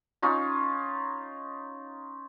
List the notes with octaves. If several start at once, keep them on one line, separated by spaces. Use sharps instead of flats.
C#4 D#4 F4